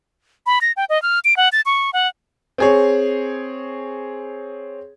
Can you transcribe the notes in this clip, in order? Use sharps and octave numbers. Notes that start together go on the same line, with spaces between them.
B5
A#6
G5
D#5
F6
D7
F#5
A6
C#6
F#5
C4 G#4 C#5